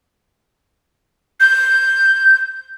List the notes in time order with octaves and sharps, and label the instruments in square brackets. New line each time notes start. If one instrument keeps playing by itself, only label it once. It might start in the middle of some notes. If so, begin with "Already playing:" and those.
[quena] G6